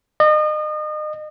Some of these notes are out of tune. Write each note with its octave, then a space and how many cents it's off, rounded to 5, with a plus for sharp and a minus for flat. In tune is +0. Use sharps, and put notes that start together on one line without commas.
D#5 -35